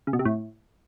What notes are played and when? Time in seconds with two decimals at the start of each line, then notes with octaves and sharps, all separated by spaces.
0.07 C#3
0.13 B2
0.19 C3
0.25 A2